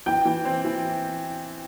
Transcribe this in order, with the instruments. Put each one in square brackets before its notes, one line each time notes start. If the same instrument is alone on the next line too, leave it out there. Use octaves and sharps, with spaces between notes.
[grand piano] E3 [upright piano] G5
[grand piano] E3
C4
E3